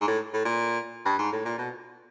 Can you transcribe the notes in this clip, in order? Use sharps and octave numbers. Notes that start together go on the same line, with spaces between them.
G#2
A2
A2
A#2
G2
G#2
A2
A#2
B2